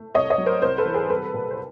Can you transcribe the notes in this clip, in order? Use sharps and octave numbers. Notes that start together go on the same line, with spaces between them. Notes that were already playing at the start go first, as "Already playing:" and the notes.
Already playing: A3
C2 C#5 D#5
C#5 D#5
F#3
A#4 C5
C2 A#4 C5
A4 B4
E3
G#4 A#4
G3 A4 B4
A#2
C5